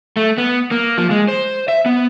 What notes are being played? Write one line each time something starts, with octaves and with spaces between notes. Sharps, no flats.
A3
B3
A#3
F3
G#3
C5
E5
B3